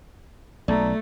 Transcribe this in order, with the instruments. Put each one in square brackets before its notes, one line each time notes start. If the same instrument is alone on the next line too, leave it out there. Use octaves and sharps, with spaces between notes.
[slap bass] B1 [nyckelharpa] A3 [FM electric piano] D5 A5 A#5